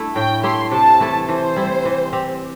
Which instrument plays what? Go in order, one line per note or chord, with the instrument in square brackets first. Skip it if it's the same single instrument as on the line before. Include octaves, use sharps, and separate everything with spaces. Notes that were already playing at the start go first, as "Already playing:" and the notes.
Already playing: [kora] A3 D4 E4
[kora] A2 [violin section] G5
[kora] A3 E4 G4 [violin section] C6
[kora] C3 [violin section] A5
[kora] E3 A3 E4
[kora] E3 [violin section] C5
[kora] G3 E4
E3
C4 G4